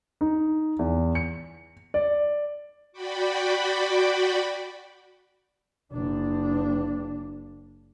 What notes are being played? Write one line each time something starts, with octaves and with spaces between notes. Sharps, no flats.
D#4
E2
C#7
D5
F#4 D5 G5 B5
F#1 D4